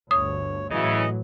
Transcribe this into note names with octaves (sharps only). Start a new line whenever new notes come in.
G1 D2 C#5 D#6
A2 C#3 E3 F#3 E4 D#5